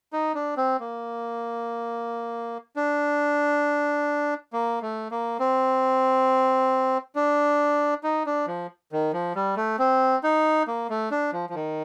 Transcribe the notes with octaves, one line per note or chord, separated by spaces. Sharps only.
D#4
D4
C4
A#3
D4
A#3
A3
A#3
C4
D4
D#4
D4
F3
D#3
F3
G3
A3
C4
D#4
A#3
A3
D4
F3
F3
D#3